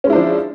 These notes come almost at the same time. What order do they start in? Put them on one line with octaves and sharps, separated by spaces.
C#4 G#3 E4 D4 F3